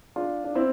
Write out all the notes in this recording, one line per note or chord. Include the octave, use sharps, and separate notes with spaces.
D4 F4
D4
C4 E4